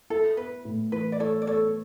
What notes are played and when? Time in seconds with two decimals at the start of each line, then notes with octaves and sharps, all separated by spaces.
0.10 E4 A4
0.37 B3 B4
0.65 A2
0.92 E3 B4
1.12 D5
1.20 E4 A4 C#5
1.42 D5
1.47 B3 A4 C#5